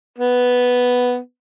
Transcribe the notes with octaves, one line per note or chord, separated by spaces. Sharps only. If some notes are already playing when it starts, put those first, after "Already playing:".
B3